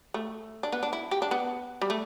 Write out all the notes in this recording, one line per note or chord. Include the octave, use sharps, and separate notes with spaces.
A3
D4
B3
D4
E4
G4
D4
B3
G3
A3